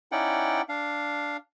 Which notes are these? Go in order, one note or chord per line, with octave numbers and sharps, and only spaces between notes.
C#4 D#4 E4 D5 F#5 G5
D4 F5